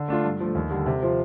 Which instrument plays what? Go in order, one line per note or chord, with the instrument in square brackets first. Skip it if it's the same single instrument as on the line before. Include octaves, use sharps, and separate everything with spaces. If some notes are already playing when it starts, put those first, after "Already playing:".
Already playing: [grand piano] D3
A3 D4 F4
G2
F3 A3
D#2
D3 G3
C3
F3 C4 F4